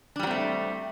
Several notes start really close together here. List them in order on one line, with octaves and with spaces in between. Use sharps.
D4 G3 F#3 C4 A3